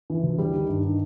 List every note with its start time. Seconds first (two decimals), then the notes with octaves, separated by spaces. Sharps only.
0.10 E3
0.23 D2
0.38 G3
0.54 D#3
0.69 G2
0.84 D#3